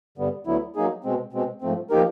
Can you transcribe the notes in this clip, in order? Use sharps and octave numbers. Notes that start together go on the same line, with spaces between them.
G2 D3 G3 B3
D2 D3 F#3 B3 E4
F#3 A#3 D#4 G#4
B2 G#3 C4
B2 G#3 C4
G#2 F3 A3 C4
F3 A#3 D#4 G4 A#4